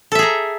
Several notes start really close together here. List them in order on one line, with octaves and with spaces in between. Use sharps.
A4 E5 G#4 A#5